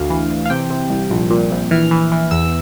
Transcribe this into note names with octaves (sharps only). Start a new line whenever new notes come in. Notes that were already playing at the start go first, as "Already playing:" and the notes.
Already playing: D2 F5
E3
E3
F5
C3 G5
C3
C2
A#1
A#2
A#1
E3 F6
E3
E3
E2 E6